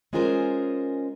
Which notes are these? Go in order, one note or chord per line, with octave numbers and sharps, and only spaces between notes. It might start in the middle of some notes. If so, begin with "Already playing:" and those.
G#3 C#4 F4 G#4 A#4 C5